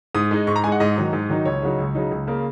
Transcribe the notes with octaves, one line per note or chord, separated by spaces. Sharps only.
G#2 D#6
G#3 D#4
G#2 C#6
A#5
G#3 D#4 F#5 G#5
G#2 D#5
D#3 F#3 D#4
G#2
D#3 F#3 D#4
C#2 C#5
C#3 F#3 D#4
C#2
C#3 F#3 D#4
C#2
C#3 A#3